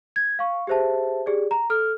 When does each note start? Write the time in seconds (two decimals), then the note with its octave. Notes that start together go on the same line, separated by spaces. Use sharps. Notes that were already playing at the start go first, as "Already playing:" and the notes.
0.16 G#6
0.39 F5 C#6
0.67 G4 G#4 C5 E5 A5
1.26 G4 G#4 D5
1.51 A#5
1.70 A4 F6